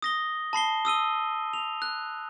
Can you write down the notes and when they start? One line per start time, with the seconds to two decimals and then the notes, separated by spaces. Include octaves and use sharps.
0.02 D#6 A#6 G7
0.53 A5 B5 C7 G7
0.85 D#6 E6 D#7 G7
1.53 F7
1.82 F#6